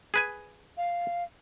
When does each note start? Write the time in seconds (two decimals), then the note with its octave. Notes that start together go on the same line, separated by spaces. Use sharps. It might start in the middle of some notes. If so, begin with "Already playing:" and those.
0.14 G#4 B4 G#5
0.77 F5